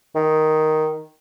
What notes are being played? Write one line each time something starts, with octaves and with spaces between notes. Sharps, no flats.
D#3